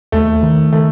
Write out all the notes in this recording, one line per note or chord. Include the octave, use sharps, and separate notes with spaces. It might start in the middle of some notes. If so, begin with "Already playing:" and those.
D#2 A3
D#3
D#3 A3